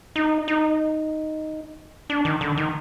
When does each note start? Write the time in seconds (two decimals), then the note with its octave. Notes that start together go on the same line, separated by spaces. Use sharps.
0.16 D#4
0.48 D#4
2.10 D4
2.25 D#3
2.41 D3
2.57 D#3